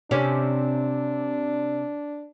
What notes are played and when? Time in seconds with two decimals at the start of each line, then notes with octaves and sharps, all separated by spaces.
0.11 C3 C#4 D4 G4